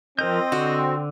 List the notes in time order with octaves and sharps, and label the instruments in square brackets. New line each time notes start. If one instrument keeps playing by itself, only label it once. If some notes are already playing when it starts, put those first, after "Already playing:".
[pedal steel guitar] F3 A#4 G6 [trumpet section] C4 [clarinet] D#5
[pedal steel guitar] D3 [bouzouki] F#4